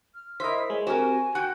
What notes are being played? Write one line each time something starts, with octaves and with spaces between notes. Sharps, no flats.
F6
E4 A#4 C5 D#5 E5 B6
G#3 C#5
C4 F#4 G4 A#4 G#5
F#4 F#5 G5